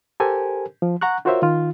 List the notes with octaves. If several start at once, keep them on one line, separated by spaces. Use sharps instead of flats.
G4 A4 A#4 C5 G#5
F3
F#5 A#5 C#6 F#6
F4 F#4 A#4 C5 C#5 E5
D#3 F4